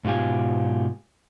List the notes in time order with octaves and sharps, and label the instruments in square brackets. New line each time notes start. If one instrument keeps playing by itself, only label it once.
[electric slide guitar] G#2 B2 F4 G4 G#5